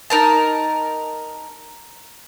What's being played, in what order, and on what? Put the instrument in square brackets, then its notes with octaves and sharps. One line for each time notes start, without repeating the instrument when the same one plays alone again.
[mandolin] D#4 A#4 A5